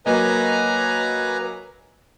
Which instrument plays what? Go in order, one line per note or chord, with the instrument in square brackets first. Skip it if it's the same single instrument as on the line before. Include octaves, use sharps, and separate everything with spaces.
[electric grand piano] F#3 A#3 D#5 [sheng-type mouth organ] B4 G#5 A#5